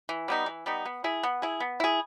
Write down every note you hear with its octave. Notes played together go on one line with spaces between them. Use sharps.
E3
G3 B3 D#4
E3
G3 B3 D#4
B3
E4 G#4
B3
E4 G#4
B3
E4 G#4